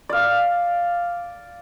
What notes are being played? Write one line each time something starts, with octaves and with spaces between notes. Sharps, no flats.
D5 F5